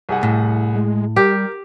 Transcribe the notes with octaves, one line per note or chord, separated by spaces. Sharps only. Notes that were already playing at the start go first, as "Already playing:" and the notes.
C2 G#4 F#5
A2
G#3
G3 G4 A#4